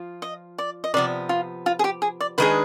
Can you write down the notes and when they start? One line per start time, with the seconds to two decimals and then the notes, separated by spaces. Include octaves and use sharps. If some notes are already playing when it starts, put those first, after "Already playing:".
Already playing: F3 F4
0.22 D#5
0.58 D5
0.84 D#5
0.94 C3 F3 B3 D5
1.29 F4
1.66 F4
1.79 G#4
1.84 G4
2.02 G#4
2.20 D5
2.38 D#3 G#3 D4 G#4 B4